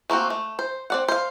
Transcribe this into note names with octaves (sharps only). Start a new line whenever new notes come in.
A3 A#3 C4 F#4
A3
C5
C4 D5 F#5
C5 F5